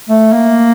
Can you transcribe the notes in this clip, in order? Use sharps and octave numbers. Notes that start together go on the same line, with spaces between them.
A3
A#3